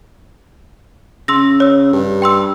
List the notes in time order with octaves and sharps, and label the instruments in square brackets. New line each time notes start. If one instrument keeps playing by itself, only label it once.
[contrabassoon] C#3 [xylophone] C6 E6 A#6
[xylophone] C#5 E6
[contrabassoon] G2
[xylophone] G5 C6 E6